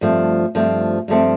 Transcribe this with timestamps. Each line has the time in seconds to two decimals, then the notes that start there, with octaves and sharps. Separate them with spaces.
0.01 G2 F3 A3 C4
0.55 G2 F3 A3 C4
1.08 G2 F3 A3 C4